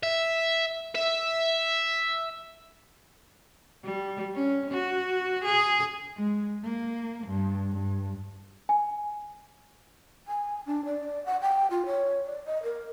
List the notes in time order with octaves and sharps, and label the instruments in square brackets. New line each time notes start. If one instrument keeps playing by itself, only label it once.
[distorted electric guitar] E5
E5
[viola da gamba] G3
C#4
F#4
G#4
[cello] G#3
A#3
G2
G2
[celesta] G#5
[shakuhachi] G#5
D4
D5
F#5
G5
F4
C#5
D5
D#5
A#4